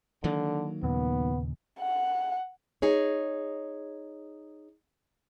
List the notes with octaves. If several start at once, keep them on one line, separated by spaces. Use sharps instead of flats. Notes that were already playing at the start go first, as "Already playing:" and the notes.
D3 D#3 F#3 A#3
D#2 A#2 C#3 B3
F#5
D#4 G#4 C#5